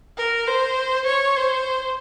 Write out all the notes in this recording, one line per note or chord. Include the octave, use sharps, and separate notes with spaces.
A#4
C5
C#5
C5